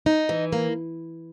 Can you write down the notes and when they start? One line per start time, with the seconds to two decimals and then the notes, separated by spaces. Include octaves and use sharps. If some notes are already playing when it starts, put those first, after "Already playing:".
0.06 D#4
0.29 E3
0.53 A#3